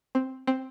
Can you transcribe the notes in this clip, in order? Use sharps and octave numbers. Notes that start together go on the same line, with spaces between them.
C4
C4